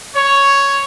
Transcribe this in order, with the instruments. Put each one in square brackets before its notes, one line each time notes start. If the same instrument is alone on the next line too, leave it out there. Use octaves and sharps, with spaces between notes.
[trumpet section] C#5